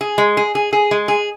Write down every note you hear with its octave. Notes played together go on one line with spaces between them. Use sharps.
G#4
G#3
G#4
G#4
G#4
G#3
G#4